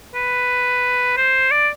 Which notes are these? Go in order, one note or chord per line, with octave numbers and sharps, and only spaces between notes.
B4
C5
D5